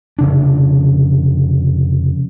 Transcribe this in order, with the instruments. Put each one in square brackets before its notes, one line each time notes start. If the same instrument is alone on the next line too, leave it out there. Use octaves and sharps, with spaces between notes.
[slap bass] F1 C#3 D4